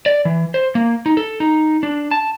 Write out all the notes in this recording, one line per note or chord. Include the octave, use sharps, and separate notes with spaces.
D5
E3
C5
A#3
D#4
A4
D#4
D4
A5